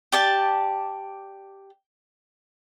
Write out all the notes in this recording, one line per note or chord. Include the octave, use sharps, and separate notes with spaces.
G4 D5 A5